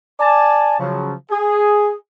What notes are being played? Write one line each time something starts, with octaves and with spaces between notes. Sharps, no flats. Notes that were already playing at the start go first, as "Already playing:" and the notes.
D5 G#5 A5
C#3 F3 F#3
G#4